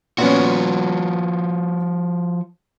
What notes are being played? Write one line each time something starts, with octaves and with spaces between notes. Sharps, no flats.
A#2 F3 B3 C#4 F#4